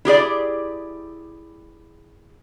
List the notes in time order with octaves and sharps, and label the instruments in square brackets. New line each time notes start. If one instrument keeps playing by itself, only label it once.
[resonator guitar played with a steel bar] E4 G4 G#4 D5